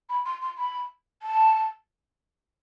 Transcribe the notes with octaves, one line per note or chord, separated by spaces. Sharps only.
B5
C6
C6
B5
A5